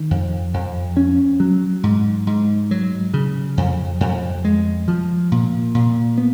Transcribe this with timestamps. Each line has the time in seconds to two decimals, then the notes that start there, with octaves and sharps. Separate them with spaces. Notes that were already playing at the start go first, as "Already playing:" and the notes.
Already playing: D#3
0.11 F2
0.54 F2
0.97 C#4
1.40 F#3
1.83 G#2
2.27 G#2
2.71 F#3
3.14 C#3
3.57 F2
4.00 F2
4.45 G#3
4.88 F3
5.32 A#2
5.75 A#2
6.18 B3